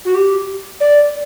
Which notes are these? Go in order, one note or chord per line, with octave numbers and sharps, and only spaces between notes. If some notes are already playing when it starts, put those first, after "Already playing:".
F#4
G4
D5